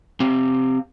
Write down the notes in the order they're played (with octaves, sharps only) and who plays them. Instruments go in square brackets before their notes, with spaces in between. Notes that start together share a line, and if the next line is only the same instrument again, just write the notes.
[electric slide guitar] C4 G4 F5